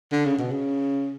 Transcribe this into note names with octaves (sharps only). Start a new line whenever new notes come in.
D3
C#3
B2
C#3